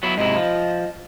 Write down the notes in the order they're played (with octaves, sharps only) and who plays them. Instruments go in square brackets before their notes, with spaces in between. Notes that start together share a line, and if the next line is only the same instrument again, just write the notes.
[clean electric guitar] F#3 B3 E4
[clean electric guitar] G#2 C3 E4 [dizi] D#5
[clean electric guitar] F3